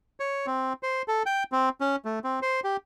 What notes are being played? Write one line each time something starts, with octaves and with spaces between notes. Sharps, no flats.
C#5
C4
C5
A4
G5
C4
C#4
A3
C4
C5
G4